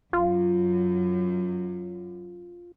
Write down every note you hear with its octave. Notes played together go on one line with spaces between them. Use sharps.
F#2 F4